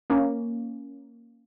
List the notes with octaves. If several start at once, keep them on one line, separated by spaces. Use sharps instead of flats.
A#3 C#4